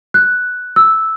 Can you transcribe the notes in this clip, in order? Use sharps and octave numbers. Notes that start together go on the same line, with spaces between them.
F#6
E6